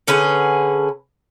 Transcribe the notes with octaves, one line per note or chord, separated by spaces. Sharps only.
D3 C#4 G#4 B4